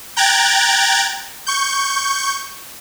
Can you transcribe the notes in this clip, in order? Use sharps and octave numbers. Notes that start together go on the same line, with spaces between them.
G5 A#5 F#6 G#6 A6
C#6 G6